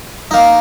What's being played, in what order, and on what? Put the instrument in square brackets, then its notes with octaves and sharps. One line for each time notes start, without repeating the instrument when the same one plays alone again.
[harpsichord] A#3 D#4